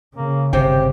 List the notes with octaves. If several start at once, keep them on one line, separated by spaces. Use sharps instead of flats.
C#3 A#3
G1 C3 G4 C5 G5